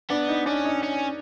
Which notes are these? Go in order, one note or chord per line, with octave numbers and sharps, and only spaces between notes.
B3 D4
D#4
C#4 D4
D#4
C#4